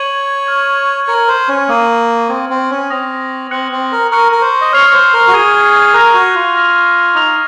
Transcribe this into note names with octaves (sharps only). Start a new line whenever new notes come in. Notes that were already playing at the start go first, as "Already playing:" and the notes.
Already playing: C#5 G#6 D#7 F#7
C#6 F6 G#6
A#4 C#6 G#6 C#7 F#7
C5
C#4
A#3 D#6 G#6 D#7
C4 D#6 G#6 D#7
C4
C#4
C4 D#6 A#6 F7
C4 F#6 C#7 F#7
C4
A#4
A#4 C#6 F#6 C#7
A#4
C5
D#5
C#5 F6 C7 F7
C5
A#4
F#4
G#4 C#6 G#6 D#7
A#4 F#6 A#6 F7
F#4
F4
F6 A#6 F7
D#4 D#6 F#6 A#6 F7